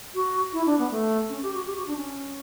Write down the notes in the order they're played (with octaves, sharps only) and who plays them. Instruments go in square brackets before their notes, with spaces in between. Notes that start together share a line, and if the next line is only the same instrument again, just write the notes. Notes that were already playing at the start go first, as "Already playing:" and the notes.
[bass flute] F#4
E4
D4
B3
A3
C#4
G4
F#4
G4
F#4
D4
C#4